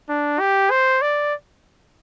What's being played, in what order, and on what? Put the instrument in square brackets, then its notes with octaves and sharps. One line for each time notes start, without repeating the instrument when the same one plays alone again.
[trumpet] D4
G4
C5
D5